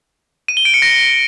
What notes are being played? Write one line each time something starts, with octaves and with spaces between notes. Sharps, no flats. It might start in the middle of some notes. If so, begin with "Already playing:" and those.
D#7
G7
D7
C#7
A#6